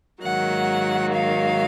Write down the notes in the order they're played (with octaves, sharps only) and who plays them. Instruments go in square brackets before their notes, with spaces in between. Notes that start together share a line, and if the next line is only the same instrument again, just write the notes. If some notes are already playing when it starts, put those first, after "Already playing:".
[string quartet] G#2 D#3 F#3 A#3 F#5
F5